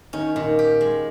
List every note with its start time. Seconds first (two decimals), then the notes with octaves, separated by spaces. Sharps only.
0.13 D#3 C#4
0.35 A#2 D#3
0.59 G4
0.81 G#3